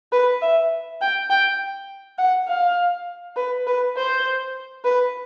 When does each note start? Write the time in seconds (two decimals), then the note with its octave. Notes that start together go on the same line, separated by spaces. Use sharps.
0.12 B4
0.42 E5
1.01 G5
1.30 G5
2.18 F#5
2.48 F5
3.36 B4
3.67 B4
3.96 C5
4.84 B4